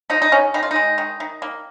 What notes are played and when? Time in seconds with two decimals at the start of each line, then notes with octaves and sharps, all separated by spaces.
0.10 F3 D#4
0.22 D#4
0.32 C#3 C#4
0.54 D#3 D#4
0.63 F4
0.71 G#3 D#4
0.98 D#3
1.20 D#3
1.42 A#3